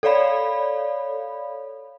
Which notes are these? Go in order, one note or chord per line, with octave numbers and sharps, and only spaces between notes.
A4 C#5 D5 F5 B5